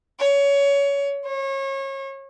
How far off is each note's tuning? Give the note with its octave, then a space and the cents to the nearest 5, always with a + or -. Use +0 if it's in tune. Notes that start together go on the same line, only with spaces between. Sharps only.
C#5 +20
C#5 -30